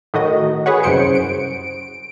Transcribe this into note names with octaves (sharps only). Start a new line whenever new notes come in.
A2 D#3 F#4 D#5
G#4 B4 C#5 F#5
C2 F#2 C#3 C5 C#7 D7
D7